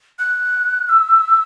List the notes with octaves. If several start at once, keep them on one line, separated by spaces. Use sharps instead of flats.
F#6
E6